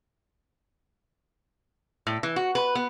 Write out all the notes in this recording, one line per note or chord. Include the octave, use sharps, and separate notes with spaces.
A2
E3
F#4
B4
B3